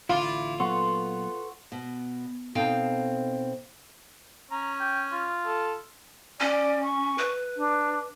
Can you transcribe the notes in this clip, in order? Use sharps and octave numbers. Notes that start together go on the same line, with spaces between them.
A1 D3 E4 F4 D6
A#2 F#3 B3 A4 B4 F#5 C6 C#6
B2
B2 C4 D#4 A4 F5 G5
C#4 A#5
G5
F4
A4
C#4 D5
C#6
B4
D4